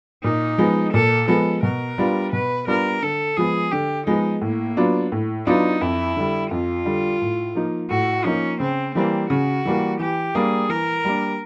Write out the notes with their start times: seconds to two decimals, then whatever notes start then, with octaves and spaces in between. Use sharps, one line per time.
0.24 A#2 D#4
0.58 F3 G#3 B3
0.93 A#2 A4
1.28 F3 G#3 B3 A4
1.63 B2 A#4
1.98 G3 B3 D4 F4
2.32 B2 B4
2.67 G3 B3 D4 F4 A#4
3.02 D3 A4
3.37 F3 G#3 B3 G#4
3.72 D3 G4
4.07 F3 G#3 B3 D#4
4.41 A2 A#3
4.77 F#3 B3 D4 F4
5.12 A2
5.47 F#3 B3 D4 D#4 F4
5.81 F2 E4
6.16 D3 G3
6.51 F2 F4
6.85 D3 G3
7.21 A2
7.55 F3 A#3 D#4
7.90 A2 F#4
8.25 F3 A#3 C#4 D#4
8.60 C#3 C4
8.95 E3 G3 A#3 C4
9.30 C#3 F#4
9.65 E3 G3 A#3
9.99 E3 G4
10.35 G3 A#3 D4 G#4
10.69 E3 A#4
11.05 G3 A#3 D4